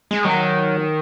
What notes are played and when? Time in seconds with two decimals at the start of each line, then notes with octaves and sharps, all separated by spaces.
0.11 G#3
0.25 D#3 F#3